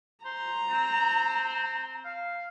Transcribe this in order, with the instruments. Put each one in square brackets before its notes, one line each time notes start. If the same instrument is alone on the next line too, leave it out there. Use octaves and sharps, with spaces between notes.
[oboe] C5 [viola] A#5
[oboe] C4
F5